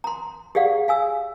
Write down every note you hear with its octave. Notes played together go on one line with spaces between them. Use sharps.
A#5 C6
G4 G#4 D5 F5 F#5
F5 G#5 E6